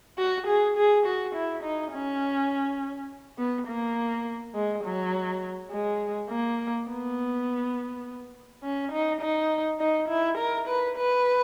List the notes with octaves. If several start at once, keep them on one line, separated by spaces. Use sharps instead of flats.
F#4
G#4
G#4
F#4
E4
D#4
C#4
B3
A#3
G#3
F#3
G#3
A#3
B3
C#4
D#4
D#4
D#4
E4
A#4
B4
B4